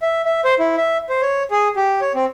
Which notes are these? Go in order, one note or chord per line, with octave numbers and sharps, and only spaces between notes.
E5
E5
C5
E4
E5
C5
C#5
G#4
G4
C#5
C4